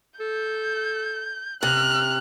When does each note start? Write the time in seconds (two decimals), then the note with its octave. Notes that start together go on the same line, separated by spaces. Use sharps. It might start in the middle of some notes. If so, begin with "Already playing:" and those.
0.20 A4 G6
1.63 C3 F6 F#6